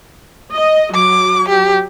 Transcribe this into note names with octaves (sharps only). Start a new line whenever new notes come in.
D#5
F#3 D6
G4